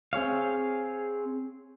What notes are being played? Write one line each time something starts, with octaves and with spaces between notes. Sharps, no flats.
C4 G#4 C#5 F5